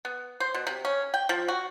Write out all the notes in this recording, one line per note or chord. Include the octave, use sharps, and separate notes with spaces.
B3
C5
B2
C3
C#4
G5
F3
F#4